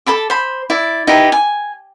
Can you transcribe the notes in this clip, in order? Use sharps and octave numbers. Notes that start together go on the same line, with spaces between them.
A4 A5 B5 D6
C5 B5
E4 D5
D#4 E4 G4 B4
G#5